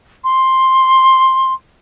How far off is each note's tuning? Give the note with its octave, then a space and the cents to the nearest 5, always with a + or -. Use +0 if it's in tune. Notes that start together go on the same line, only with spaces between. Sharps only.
C6 +10